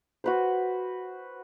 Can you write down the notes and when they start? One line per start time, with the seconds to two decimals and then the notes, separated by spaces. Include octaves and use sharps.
0.24 F#4 B4 C5